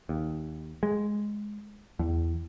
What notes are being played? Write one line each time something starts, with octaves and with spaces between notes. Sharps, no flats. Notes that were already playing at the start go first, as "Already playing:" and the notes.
D#2
G#3
E2